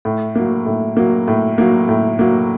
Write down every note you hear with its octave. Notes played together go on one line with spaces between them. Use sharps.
A2
F#3 A#3
A2
F#3 A#3
A2
F#3 A#3
A2
F#3 A#3